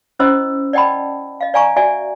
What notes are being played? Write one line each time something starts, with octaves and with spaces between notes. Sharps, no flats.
C#4 E4 C5 D#5 B5 E6
D5 D#5 F#5 G5 A5 B5
D#5 F5
D5 F5 G#5 A#5 C#6
F#4 D5 E5 G#5